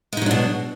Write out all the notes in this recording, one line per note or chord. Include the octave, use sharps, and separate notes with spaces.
B2 F#3 G#3 D4 D#4